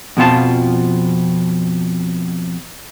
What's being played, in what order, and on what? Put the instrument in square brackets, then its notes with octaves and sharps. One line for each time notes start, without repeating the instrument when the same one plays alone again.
[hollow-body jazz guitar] F2 B2 F3 F4 A5